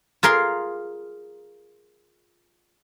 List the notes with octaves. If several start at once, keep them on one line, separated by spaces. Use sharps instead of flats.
F4 G#4 A#4 F5 C6